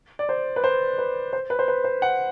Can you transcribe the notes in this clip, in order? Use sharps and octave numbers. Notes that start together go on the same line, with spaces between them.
D5
C5
B4
C5
B4
C5
B4
C5
B4
C5
F#5